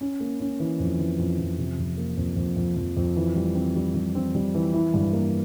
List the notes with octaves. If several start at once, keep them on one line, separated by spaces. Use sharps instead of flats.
C#4
A#3
C#4
E3
F2
E3
F2
F2
C3
F2
A#3
F2
F2
F2
F2
F2
E3
G3
C4
G3
G3
C4
G3
E3
E4
G2
A#3